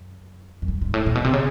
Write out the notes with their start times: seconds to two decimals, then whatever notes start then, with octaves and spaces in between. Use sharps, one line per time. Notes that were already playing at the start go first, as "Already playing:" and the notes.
Already playing: F#2
0.62 F#2
0.68 G2
0.81 G#2
0.94 A2
1.06 A#2
1.15 B2
1.24 C3
1.33 C#3